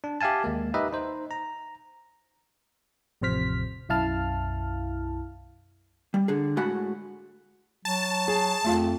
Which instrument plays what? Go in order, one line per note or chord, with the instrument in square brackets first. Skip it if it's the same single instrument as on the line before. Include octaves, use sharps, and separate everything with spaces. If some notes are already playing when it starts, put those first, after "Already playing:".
[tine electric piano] D4
G4 E5 F5 G#5 A5
D#2 G#3 A#3
D#4 G4 B4 D#5 E5
D#4 C5
A#5
[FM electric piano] A1 F2 C3 C5 F6 B6
B1 F#2 E4 F5 A5 F6
[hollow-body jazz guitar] G3
D3 G#4
A2 G#3 F#4 F#5 B5
[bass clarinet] F#3 [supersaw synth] A5
[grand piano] G#4
[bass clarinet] F2 [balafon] A3 F4 F5